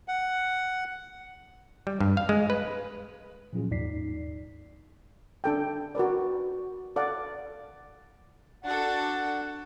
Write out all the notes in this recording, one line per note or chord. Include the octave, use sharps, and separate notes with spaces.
F#5
G3
G2
F5
G#3
B4
A#2 F3 F#3 C#4 F4 G#4
D#2 G#2 D#4 D5 B6 C7
D4 A4 G5
F#4 A#4 B4 D5
A4 D5 F5 F#5
D4 F#4 A4 F#5